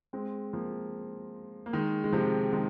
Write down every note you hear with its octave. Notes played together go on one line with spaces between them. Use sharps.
G#3 C4
F3 A#3
A#3
D#3 G#3
G#3
C3 F3
D#3 G#3